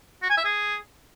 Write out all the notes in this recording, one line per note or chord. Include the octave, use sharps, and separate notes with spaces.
F#4
G#5
E5
G#4